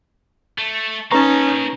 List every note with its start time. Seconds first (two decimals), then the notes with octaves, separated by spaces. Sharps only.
0.58 A3
1.12 A#3 C#4 D#4 B4 A5 A#5 C#6